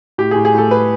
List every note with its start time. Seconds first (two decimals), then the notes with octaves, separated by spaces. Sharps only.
0.18 A2 G4
0.31 A2 G#4
0.45 G#4
0.54 A2 A4
0.71 A2 B4